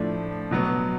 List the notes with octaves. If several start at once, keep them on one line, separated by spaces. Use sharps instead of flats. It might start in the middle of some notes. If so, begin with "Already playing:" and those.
Already playing: A2 F3 A3 D4
B2 F#3 B3